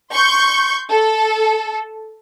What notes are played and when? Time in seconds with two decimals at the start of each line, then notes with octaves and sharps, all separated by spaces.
0.13 C6 C#6 G6
0.91 A4